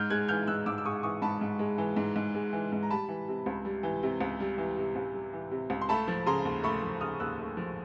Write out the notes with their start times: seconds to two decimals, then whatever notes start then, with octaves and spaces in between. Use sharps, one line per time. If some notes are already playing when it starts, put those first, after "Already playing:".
Already playing: G#2 F6 G6
0.10 G#3 F#6 G#6
0.28 E3 F6 G6
0.47 G#2 E6 F#6
0.66 G#2 D6 E6
0.78 E6
0.85 G#3 C#6 D#6
1.03 E3 C#6 D#6
1.22 G#2 A5 B5
1.41 G#2
1.59 G#3
1.78 E3
1.96 G#2
2.16 G#2
2.35 G#3
2.52 E3
2.72 G#2
2.83 A#5
2.90 G3 A5 B5
3.08 E3
3.28 C3
3.46 C#2
3.65 G3
3.83 E3
4.03 C3
4.21 C#2
4.40 G3
4.58 E3
4.77 C3
4.96 C#2
5.14 G3
5.33 E3
5.51 C3
5.70 C#2
5.81 C6
5.89 A3 A5 B5
6.08 F3
6.26 C#3 A#5 C6
6.45 D#2
6.63 A3 B5 C#6
6.83 F3
7.01 C#3 D#6 F6
7.20 D#2 E6 F#6
7.39 A3
7.57 F3